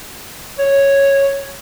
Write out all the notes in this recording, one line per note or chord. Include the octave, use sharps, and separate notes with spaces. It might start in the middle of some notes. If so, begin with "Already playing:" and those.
C#5